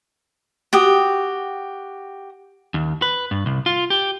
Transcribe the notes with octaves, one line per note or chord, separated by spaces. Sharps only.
F#4 G4 D#6
D#2
B4
G2
C2
F4
G4